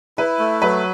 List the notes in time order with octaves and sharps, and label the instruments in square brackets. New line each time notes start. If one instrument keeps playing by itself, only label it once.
[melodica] E4 [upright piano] B4
[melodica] A3
[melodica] F#3 [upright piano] B4